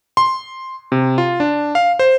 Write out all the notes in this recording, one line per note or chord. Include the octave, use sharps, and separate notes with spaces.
C6
C3
F4
D4
F5
C5